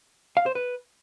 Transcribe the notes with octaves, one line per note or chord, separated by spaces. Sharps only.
F5
C5
B4